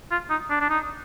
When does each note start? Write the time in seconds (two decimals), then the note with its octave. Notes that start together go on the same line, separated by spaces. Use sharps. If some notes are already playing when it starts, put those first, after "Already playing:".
0.11 F4
0.30 D#4
0.50 D4
0.61 D4
0.69 D#4